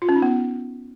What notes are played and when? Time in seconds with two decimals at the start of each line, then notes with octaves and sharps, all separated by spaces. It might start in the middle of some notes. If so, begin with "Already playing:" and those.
0.02 F4
0.09 C#4
0.16 D#4
0.22 B3